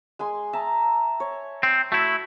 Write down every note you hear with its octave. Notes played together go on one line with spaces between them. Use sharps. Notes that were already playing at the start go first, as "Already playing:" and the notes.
G#3 G#5 C6
E5 A5 A#5
C#5
C4
A3 E4 F#4